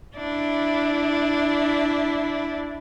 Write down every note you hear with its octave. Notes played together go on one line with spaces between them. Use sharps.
D4 E4